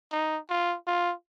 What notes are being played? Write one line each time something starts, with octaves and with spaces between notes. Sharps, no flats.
D#4
F4
F4